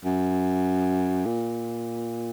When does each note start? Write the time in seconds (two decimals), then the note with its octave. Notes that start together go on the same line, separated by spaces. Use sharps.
0.05 F#2
1.26 A#2